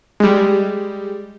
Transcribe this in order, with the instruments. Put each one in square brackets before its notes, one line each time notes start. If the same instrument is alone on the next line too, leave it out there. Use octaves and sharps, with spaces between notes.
[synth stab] G3 G#3